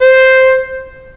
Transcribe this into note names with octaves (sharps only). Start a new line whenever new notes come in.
C5